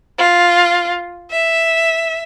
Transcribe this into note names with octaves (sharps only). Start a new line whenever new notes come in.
F4
E5